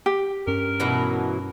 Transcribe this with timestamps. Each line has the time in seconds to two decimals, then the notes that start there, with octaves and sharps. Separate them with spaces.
0.06 G4
0.47 G2 C#4 A#4
0.80 B2 E3 F#3